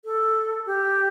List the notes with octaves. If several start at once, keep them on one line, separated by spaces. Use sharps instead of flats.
A4
G4